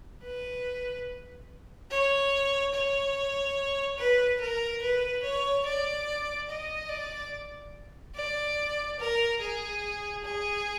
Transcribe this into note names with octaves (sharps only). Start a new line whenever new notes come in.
B4
C#5
C#5
B4
A#4
B4
C#5
D5
D#5
D5
D5
A#4
G#4
G#4